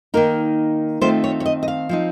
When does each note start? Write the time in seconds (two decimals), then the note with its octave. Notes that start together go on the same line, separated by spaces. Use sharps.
0.14 D#3 A#3 D#4 A#4
1.01 D#3 A3 C4 F4 C5
1.24 C#5
1.40 C#5
1.46 D#5
1.63 D#5
1.68 F5
1.89 F3 C4 D#4